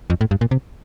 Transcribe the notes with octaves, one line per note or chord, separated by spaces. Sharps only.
F2
A2
G2
A#2
C3